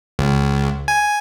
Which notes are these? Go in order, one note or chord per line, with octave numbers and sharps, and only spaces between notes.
C#2
G#5